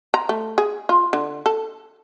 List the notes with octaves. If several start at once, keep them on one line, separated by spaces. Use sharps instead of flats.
A#5
A3
G#4
F4
D3
A4